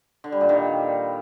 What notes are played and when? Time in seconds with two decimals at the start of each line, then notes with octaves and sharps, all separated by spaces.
0.24 D3
0.32 G3
0.41 A#2
0.49 D#3